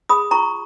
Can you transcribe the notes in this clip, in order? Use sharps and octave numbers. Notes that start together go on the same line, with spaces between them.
G#4 B5 D#6
F4 A#5 C#6